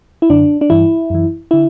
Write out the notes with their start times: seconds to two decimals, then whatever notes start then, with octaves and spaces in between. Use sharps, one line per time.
0.22 E4
0.30 F#2 D3 D4
0.61 D4
0.70 G2 E3 E4
1.10 F#2 E3
1.51 D3 E4